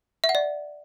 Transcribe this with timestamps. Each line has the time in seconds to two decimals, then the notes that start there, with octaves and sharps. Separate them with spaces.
0.24 E5
0.29 F#5
0.35 D5